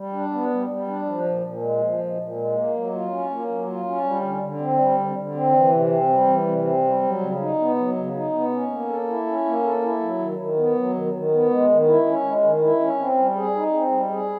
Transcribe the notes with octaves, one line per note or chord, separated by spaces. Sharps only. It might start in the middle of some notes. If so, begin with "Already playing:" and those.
Already playing: G3
D4
B3
G3
G3
D4
F3
A#2
A#2
G#3
F3
A#2
A#2
G#3
A#3
F#3
F4
C#4
A#3
F#3
F4
C#4
G3
D3
D3
C4
G3
D3
D3
C4
E3
C3
C4
G3
E3
C3
C4
G3
F#3
C#3
D#4
B3
F#3
C#3
D#4
B3
C#4
A#3
A4
E4
C#4
A#3
A4
E4
F#3
D#3
D#3
B3
F#3
D#3
D#3
B3
G#3
D#3
E4
C#4
G#3
D#3
E4
C#4
C4
G3
G#4
D#4
C4
G3
G#4